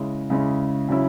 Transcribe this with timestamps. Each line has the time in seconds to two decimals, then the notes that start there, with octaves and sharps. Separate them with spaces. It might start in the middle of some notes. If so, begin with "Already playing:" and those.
Already playing: C#3 G#3 C#4 E4
0.30 C#3 G#3 C#4 E4
0.89 C#3 F#3 C#4 E4